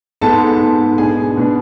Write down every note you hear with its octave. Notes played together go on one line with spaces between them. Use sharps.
G#2 G#3 B3 A4 A5
G#2 G#3 B3
B2 B3 D4 G#4 G#5
B2 B3 D4